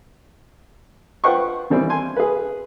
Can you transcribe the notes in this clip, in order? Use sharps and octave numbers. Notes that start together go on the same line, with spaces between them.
F4 B4 C5 F#5 G5 C#6
D#3 E3 G3 C4
G#5 C6
G#4 B4